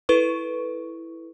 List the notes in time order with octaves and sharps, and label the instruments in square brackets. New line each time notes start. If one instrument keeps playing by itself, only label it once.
[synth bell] E4 A4 B4 C#6